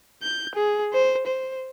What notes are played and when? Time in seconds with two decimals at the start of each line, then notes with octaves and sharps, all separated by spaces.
0.23 G6
0.55 G#4
0.94 C5
1.27 C5